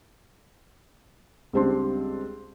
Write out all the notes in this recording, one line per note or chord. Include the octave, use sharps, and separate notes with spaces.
C#2 G3 C4 D4 C6